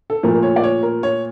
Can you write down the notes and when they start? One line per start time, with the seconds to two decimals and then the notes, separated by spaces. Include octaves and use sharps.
0.10 A4
0.23 A#2 F3 A3 A#4
0.34 A#4
0.43 C#5
0.56 D5
0.64 C#5
0.83 A#4
1.03 C#5